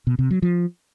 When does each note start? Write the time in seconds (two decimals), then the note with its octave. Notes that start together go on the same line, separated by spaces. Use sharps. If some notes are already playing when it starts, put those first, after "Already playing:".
0.07 B2
0.19 C3
0.31 F#3
0.42 F3